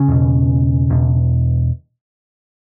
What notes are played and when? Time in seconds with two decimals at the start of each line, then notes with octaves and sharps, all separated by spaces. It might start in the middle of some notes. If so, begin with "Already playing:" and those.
Already playing: C#3 C#4
0.08 E2 B2
0.90 E2 B2